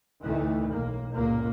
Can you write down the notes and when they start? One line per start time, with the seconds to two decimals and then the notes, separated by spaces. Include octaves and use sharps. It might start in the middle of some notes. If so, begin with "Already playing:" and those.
0.23 D2 A2 D#3 E3 A3
0.71 B1 A#3
1.15 G1 C#2 A#2 A#3